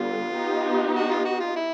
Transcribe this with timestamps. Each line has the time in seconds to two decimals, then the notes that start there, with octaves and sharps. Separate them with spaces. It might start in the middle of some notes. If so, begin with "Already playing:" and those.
Already playing: D3 G3 B3 F4
0.31 B3 D#4 G4
0.94 F#4
1.09 F4
1.25 F#4
1.40 F4
1.56 E4